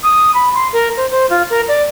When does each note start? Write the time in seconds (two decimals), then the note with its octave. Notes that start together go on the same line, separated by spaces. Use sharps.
0.03 D#6
0.35 B5
0.54 C6
0.73 A#4
0.97 C5
1.11 C5
1.30 F4
1.50 A#4
1.68 D5